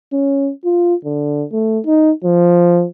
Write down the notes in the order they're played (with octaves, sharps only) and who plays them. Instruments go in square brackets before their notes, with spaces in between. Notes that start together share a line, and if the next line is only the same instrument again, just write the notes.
[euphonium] C#4
F4
D3
A3
D#4
F3